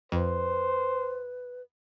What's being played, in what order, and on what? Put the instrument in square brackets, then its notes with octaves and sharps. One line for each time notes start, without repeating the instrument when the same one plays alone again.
[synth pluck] F2 [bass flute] B4 [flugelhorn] C5